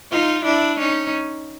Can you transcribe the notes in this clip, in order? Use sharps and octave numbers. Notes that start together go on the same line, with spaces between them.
D#4 F4
D4 E4
C#4 D#4